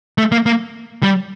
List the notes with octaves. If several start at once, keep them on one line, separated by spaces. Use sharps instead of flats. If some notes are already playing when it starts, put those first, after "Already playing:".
A3
A#3
A#3
G3